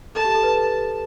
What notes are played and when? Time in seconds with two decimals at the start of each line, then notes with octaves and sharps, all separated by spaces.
0.15 A4 A5
0.25 G4
0.34 A4
0.43 B4